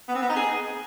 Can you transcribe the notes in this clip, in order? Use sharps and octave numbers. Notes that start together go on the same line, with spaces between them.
B3
C4
B3
D#4
G#4